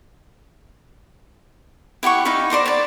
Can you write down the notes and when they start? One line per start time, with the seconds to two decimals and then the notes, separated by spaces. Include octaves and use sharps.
2.03 E4 G4 F#5 C#6
2.25 D#4 E5 F5 B5
2.50 C5 D5 A#5 C6
2.66 C#5 D5